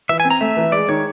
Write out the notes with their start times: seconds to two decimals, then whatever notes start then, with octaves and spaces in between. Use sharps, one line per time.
0.09 E3 E5
0.20 G#5
0.25 C4
0.30 A#5
0.41 A3 E5
0.57 E3
0.72 G#3 D5
0.88 D#3 C#5